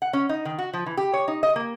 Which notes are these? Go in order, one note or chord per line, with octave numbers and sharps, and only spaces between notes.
F#5
C#4
D#4
D#3
F#4
F3
E3
G4
C#5
D#4
D#5
A#3